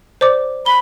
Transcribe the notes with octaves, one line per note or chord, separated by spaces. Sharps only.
C5 D5 D6
B5 G7